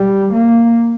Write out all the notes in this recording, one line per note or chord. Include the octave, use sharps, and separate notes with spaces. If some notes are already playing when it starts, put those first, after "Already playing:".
Already playing: G3
A#3